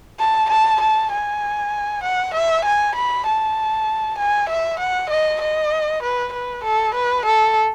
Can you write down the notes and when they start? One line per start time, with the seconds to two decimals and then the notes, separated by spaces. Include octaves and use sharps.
0.20 A5
0.50 A5
0.81 A5
1.12 G#5
2.04 F#5
2.34 E5
2.65 G#5
2.96 B5
3.26 A5
4.18 G#5
4.49 E5
4.80 F#5
5.10 D#5
5.41 D#5
6.03 B4
6.33 B4
6.64 A4
6.95 B4
7.25 A4